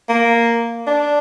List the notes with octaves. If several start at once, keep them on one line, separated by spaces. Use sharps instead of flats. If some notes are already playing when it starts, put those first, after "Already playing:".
A#3
D4